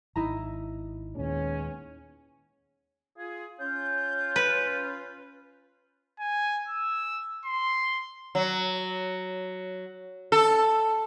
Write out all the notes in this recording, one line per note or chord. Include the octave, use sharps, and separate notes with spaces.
G#1 D#4 E4 A#5
D#2 A#2 G#3 B3 C#4
F4 G#4
C#4 F4 G6
B4
G#5
E6
C6
F#3
A4